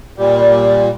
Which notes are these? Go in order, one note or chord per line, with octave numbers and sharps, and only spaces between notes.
A#2 G3